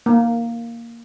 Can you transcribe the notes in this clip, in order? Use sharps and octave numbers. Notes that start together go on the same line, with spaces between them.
A#3